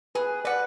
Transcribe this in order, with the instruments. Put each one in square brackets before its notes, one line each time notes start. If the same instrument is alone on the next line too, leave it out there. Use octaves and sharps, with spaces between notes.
[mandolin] G#4 [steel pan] B4
[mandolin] B4 F#5 [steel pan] D5